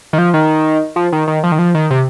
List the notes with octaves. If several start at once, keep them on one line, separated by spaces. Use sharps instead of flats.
D#3
F3
D#3
F3
D#3
D#3
F3
D#3
F3
D#3
C3